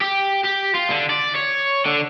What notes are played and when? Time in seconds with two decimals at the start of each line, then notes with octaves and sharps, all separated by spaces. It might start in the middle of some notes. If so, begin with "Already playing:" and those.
0.01 G4
0.44 G4
0.74 F4
0.90 D3
1.10 D5
1.35 C#5
1.86 D3